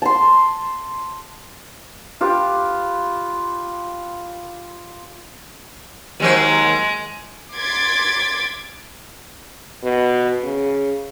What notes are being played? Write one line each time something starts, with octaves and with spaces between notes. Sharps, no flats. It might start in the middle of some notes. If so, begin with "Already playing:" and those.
A5 C6
F4 G4 B4
D#2 F#3 G#3 C5
C6 D6 G#6 A6 B6 D7
B2
C#3